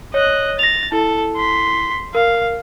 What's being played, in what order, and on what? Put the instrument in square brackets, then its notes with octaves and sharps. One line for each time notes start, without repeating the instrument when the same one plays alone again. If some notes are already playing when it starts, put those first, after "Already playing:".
[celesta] C#5 [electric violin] D#5 F#6
[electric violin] A6 [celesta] A#6 F7
[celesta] E4 [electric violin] A4
[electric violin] C6 B6
[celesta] A#4 [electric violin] F5